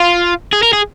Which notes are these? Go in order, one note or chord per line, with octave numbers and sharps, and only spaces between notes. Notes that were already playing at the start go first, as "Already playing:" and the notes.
Already playing: F4
G#4
A#4
G#4